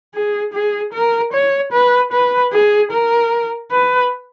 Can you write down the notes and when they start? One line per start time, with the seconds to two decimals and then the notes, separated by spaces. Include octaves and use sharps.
0.15 G#4
0.53 G#4
0.93 A#4
1.33 C#5
1.73 B4
2.12 B4
2.53 G#4
2.91 A#4
3.71 B4